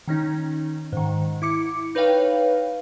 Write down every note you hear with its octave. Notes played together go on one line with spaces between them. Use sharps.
D#3 C#4 D#4
G#2 D#3
E4 D6 C#7
D#4 B4 C#5 F5 G5